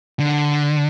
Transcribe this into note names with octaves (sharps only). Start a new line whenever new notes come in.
D3